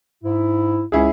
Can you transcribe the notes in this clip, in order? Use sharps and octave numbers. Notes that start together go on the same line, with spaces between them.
G#2 E4
C#2 C#4 E4 G#4